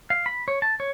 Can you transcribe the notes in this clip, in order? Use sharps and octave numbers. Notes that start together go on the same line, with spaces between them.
F5
B5
C#5
A5
C#5